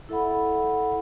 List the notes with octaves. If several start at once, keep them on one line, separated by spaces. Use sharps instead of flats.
E4 A4 E5 F#5 B5